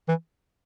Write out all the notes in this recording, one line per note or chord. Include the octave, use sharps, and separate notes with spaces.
E3